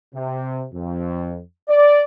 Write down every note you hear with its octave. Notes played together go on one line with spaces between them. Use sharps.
C3
F2
D5